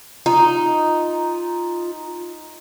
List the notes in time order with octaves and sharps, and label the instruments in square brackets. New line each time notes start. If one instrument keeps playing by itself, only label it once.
[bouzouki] D#4 [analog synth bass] F4